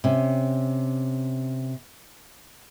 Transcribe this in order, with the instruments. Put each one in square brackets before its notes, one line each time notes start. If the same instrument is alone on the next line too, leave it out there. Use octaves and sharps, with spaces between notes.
[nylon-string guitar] C3 C#4